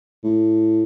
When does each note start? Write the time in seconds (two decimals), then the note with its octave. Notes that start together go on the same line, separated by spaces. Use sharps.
0.24 A2